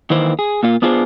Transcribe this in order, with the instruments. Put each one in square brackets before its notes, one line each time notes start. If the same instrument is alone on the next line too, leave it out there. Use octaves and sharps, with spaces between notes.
[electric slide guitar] D#3 E3 A#3 E4 C5
G#4
A#2 A#3 F4
B3 D4 F4 G#4 B4 C5